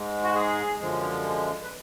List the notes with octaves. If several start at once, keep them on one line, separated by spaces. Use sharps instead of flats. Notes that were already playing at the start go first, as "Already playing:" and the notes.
Already playing: G#2 G#3
F#4
G#4
F#2 D3 F3 G#3
B4